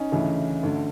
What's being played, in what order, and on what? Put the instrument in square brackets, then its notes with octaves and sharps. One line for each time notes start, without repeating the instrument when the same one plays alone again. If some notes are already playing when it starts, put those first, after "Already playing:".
Already playing: [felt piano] C#4 D#4
D2 C#3 E3
D2 D3